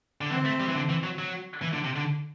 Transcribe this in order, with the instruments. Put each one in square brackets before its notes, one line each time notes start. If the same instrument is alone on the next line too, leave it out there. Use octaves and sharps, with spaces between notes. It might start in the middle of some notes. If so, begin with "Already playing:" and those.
[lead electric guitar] D3
[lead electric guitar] E3 [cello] C4
[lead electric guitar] A3
G3
E3
D3
E3
F#3
F#3
E3
D3
C3
D3